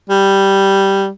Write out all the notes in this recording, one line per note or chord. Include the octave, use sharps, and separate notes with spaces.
G3